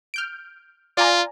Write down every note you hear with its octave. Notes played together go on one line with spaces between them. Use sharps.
F6 G6 D7
F4 D5 G#5 A#5